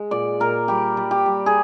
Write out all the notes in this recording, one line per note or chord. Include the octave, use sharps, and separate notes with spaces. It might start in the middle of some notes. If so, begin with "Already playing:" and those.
Already playing: G#3
A#2 D5
A#2 A#4
G3 G4
G3
G4
G3
G#4